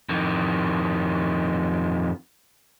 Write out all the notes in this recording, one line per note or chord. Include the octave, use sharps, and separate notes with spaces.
F2 D#3